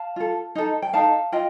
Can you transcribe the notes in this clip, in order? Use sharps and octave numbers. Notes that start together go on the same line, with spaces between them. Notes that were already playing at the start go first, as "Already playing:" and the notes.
Already playing: F5 A5
F4 A4
D#4 A4
G5
D#4 A4 F5 A5
F4 D#5 G5